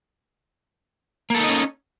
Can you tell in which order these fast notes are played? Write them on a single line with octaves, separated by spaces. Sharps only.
A#3 A4 D#4 D#5 C#4